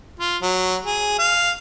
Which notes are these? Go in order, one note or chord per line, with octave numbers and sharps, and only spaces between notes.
F4
F#3
G#4
F5